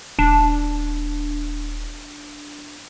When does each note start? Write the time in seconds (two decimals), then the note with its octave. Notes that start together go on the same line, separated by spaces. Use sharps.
0.19 D#1 D4